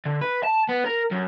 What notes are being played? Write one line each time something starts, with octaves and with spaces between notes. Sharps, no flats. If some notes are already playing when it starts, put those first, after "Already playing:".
D3
B4
A5
B3
A#4
F#2